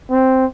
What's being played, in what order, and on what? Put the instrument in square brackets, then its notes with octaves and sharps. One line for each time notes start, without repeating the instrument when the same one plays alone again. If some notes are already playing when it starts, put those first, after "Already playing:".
[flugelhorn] C4